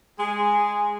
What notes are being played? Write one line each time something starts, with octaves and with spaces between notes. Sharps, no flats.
G#3 G#4